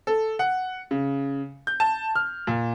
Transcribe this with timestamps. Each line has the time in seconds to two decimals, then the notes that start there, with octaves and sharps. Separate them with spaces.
0.07 A4
0.39 F#5
0.91 C#3
1.67 G6
1.80 A5
2.15 F6
2.47 A#2